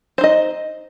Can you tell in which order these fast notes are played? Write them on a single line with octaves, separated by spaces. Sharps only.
C5 D#4 D#5